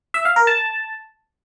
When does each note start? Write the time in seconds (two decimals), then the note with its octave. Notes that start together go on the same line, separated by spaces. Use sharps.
0.14 E5
0.25 F5
0.36 A#4
0.47 A5